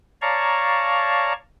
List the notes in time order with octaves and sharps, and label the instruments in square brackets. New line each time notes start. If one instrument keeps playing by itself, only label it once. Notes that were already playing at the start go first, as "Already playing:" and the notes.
[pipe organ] C#5 D5 F5 A5 A#5 C#6